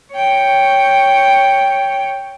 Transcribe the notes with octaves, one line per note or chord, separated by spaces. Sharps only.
C#5 G5